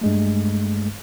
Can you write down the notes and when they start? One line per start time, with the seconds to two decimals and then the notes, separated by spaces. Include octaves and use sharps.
0.01 G2 G#3 A3